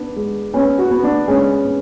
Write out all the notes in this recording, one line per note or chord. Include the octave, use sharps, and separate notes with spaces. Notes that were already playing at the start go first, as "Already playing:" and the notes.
Already playing: B3 D4
G#3
B3 C#4
F#4
B3
D4
G#3 C#4
B3